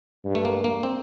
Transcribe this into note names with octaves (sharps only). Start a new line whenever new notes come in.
G2
A3
A#3
A#3
C4